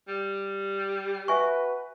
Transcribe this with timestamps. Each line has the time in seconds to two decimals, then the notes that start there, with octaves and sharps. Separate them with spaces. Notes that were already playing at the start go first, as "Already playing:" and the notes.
0.08 G3
1.28 F#4 B4 E5 G#5 C#6